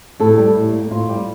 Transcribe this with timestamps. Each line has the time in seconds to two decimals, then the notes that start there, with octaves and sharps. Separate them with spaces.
0.20 A2 A4
0.38 G3
0.55 A2
0.73 A#3
0.91 A2 F4
1.09 G3